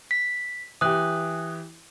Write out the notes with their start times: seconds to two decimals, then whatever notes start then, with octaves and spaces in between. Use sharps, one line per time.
0.11 B6
0.81 E3 G4 D#6 F#6